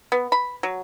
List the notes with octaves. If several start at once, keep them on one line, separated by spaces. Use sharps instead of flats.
B3
B5
F#3